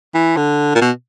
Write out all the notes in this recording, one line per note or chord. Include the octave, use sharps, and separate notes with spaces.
E3
D3
A#2
B2